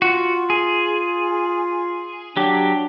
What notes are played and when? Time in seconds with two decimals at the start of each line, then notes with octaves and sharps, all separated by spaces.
0.02 F4 F#4
0.50 G#4
2.37 F#3 D4 G4